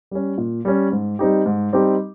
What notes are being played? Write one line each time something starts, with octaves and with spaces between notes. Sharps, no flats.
G3 C#4
A#2
G3 C#4
G#2
G3 C4 D#4 G4
G#2
G3 C4 D#4 G4